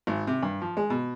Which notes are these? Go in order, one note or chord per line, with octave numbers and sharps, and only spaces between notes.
G#1
C3
G2
F3
G#3
B2